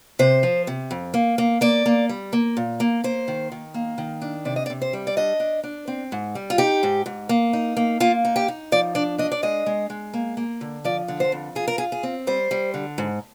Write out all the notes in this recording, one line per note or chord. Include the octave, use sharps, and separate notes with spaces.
C3 C5
F3
C3
F2
A#3
A#3
A#3 D5
A#3
G3
A#3
A#2
A#3
A#3 C5
D#3
D#3
A#3
D#3
D4
C3 D5
D#5
D5
C3
C5
G3
D5
D4 D#5
D4
D4
C4
G#2
G3
F4
D#4 G4
G#2
G#2
A#3
D#4
A#3
A#3 F4
D#4
G4
D#4
F3 D5
D4 D5
D4 D#5
D5
G#3 D#5
G#3
G#3
A#3
A#3
D3
F3 D5
D3
C5
F2
F4 G#4
A#4
F4 G#4
G#4
C4
G3 C5
G3
D3
G#2